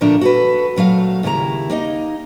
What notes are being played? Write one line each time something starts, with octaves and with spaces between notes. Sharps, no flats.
A#2 D3 F3 A3 D4 A#4
F#4 A4 B4
A#2 F#3 A3 F5
D#2 C#3 E4 C5 A#5
A#3 D#4 D#5